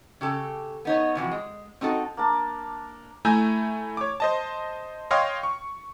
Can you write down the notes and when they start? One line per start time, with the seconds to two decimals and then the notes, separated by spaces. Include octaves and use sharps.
0.21 C#3 G4 A4
0.85 B3 D#4 C#5
1.15 C3 E3 F3 F#4
1.31 G#3
1.81 C4 D#4 F#4 A4
2.17 A#3 D4 A#4 A5
3.25 A3 E4 G#5 A#5 E6 G6
3.97 C#5 D6
4.20 C5 D#5 A5
5.11 C#5 D#5 F5 G5 C6 F6
5.43 C#6